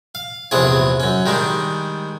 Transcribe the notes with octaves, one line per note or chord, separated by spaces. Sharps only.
F5
A#1 E2 C3 D4 G#4 C#5
F#2 C#4
D#3 G3 G#3 D4